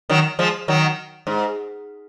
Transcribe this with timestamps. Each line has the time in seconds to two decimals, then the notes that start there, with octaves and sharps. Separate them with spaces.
0.10 D#3 F#3
0.39 F3 G#3
0.68 D#3 F#3
1.27 G#2